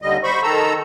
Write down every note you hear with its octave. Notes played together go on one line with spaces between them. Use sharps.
D#2 D3 G3 D#5
C5 B5 C#6
D#3 A4 A#5 E6